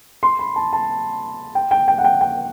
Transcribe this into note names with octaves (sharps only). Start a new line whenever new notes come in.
C6
B5
A5
A5
G5
G5
G5
F#5
G5
G5